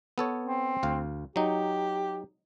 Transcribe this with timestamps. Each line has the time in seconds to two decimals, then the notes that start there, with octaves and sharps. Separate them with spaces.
0.18 B3 A4 C#5
0.45 C4
0.83 D2 F5
1.36 F#3 D#4 G4